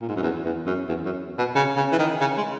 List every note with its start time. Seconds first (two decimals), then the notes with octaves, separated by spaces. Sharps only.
0.01 A#2
0.08 G#2
0.16 F#2
0.23 E2
0.45 E2
0.66 F#2
0.88 E2
1.05 F#2
1.38 B2
1.55 C#3
1.76 C#3
1.92 E3
1.99 D#3
2.21 C#3
2.37 G#3